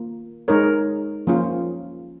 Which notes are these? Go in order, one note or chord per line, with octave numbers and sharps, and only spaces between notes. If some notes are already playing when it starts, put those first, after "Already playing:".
Already playing: A#3 F4
G#3 D#4 A#4 C#5
F3 A#3 C#4 F4